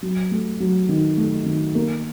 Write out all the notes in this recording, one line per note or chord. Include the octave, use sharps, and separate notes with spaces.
F#3
A3
F#3
D#3
A3
D#3
A#3